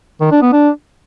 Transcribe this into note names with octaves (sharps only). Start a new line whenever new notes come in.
D#3
D4
B3
D4